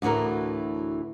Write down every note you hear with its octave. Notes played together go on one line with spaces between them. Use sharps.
D2 A2 E3 F#4 A#4